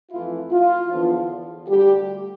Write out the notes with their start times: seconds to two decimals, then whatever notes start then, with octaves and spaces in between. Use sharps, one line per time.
0.11 F2 E3 A3 E4 F4
0.51 F4
0.90 E2 D3 F3
1.68 D2 D3 G3 G4